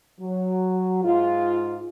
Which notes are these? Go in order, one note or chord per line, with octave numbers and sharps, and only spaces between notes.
F#3
G#2 F4